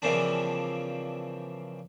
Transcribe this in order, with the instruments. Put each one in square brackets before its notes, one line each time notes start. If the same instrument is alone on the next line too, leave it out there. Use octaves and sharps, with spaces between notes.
[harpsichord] C#3 E3 F3 A#3 C4 D4